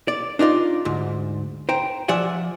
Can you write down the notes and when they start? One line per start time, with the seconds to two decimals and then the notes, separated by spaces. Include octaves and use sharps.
0.08 D5
0.39 D4 D#4 F4 D5
0.85 D2 G#2
1.69 C5 G5 A#5
2.08 F3 D5 E5 F#5 G#5